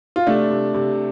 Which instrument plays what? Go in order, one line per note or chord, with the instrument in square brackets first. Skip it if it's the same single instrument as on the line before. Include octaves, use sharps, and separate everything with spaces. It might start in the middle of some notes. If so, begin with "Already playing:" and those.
[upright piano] F4
C3 A3 D4
C3
C3